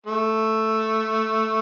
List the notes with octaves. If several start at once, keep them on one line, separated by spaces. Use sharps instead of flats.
A3